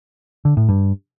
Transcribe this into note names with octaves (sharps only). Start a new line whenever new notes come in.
D3
A2
G2